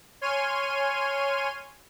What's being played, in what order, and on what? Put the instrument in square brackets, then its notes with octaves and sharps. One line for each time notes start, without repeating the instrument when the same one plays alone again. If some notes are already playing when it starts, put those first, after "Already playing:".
[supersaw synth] C#5 G#5 C6 F6 D#7